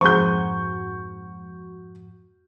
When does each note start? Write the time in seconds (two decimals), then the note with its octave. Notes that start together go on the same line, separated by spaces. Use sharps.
0.01 F2 G#2 F#4 G#4 A#4 C5 C#6 G6